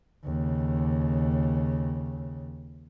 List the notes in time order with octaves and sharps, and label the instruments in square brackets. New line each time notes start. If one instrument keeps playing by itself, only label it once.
[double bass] D#2 C#3